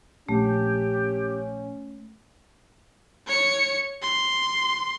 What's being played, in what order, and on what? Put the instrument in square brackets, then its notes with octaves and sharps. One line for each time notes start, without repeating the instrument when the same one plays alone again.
[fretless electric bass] A#1 [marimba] A3 [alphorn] C#4 [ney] G4
[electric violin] C#5 C#7
C6